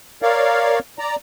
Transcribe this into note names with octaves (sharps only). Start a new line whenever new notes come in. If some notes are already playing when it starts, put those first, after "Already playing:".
A#4 C#5 D5 F5
D5 A#5